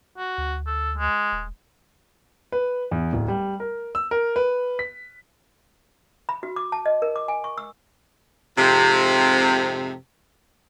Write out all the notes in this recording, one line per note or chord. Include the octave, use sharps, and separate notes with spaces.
F#4
D2
A4
G#3
D#1
B4
E2
D1
G3
A#4
E6
A#4
B4
B6
B5
F#4
D6
A5
D#5
A#4
D6
G#5
C#6
E6
F2 G#2 C3